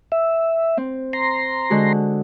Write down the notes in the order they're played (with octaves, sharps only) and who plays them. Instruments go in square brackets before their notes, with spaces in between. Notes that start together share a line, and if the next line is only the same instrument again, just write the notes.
[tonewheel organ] E5
[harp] C4
[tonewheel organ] A#5 C6
[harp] D3 G#3 F#4